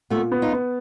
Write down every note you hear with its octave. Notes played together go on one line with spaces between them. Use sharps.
A#2 A3 B3
B3
D#4 F4
B3